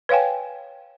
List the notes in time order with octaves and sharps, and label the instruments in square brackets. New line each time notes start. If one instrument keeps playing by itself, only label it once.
[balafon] B4 C#5 F5 G5 G#5